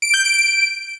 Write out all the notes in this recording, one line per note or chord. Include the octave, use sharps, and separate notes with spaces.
D7
G6
D7